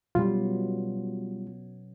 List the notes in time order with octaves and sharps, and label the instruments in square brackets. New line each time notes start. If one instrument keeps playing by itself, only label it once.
[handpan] B2 F#3 [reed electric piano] G3 F4